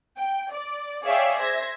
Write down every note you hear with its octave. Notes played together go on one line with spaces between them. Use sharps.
G5
D5
G#4 C#5 D5 E5 F5 G5
C5 E5 G#6 A#6